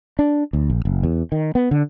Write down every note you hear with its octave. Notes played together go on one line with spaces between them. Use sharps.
D4
D2
A#1
F#1
E2
D#3
B3
D3